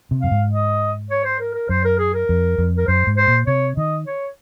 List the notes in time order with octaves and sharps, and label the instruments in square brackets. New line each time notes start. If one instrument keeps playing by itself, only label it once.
[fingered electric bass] C3
[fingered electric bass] F#2 [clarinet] F5
[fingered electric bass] G#2
[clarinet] D#5
C#5
C5
A#4
A#4
[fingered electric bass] F#2 [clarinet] C5
[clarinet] A#4
G#4
A#4
[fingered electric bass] F2
F2
[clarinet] A#4
[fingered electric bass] F#2 [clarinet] C5
[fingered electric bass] G#2
[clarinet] C5
[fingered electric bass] A#2
[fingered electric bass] C3 [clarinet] C#5
[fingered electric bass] D#3 [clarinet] D#5
[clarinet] C#5